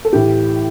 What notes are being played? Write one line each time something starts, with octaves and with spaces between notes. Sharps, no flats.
A4
A2 E3 G4